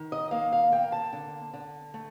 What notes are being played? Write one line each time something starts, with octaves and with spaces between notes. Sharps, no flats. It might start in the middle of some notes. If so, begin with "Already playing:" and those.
Already playing: D#3
D#5
A#3 F5
F5
A#3 G5
A5
D3
D3
A3